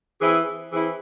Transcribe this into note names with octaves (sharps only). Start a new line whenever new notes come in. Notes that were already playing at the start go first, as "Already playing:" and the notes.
E3 C4 E4 G#4
E3 C4 E4 G#4